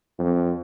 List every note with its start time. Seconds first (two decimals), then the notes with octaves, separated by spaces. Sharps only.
0.19 F2